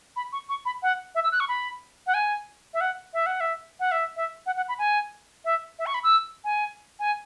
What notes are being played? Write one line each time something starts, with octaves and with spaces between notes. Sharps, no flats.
B5
C#6
C#6
B5
F#5
E5
E6
F#6
C#6
B5
F#5
G#5
E5
F#5
E5
F#5
E5
F#5
E5
E5
F#5
F#5
B5
G#5
E5
E5
C#6
B5
E6
G#5
G#5